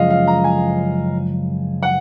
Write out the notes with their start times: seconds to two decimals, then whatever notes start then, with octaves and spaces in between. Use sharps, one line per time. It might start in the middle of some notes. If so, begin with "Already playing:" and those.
Already playing: F#2 C#3 F3 G#3 D#5 F5
0.10 F5
0.27 A#5
0.44 G#5
1.83 F#5